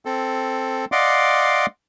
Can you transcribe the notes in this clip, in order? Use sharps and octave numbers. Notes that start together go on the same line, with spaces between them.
C4 A4
D5 D#5 F5 F#5 C6 D6